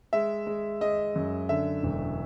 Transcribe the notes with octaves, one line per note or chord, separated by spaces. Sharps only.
G#3 E5
G#3
G#3 D#5
F#2
D3 E5
E1